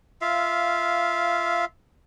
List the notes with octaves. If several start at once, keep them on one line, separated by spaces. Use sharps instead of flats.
F4 E5 F5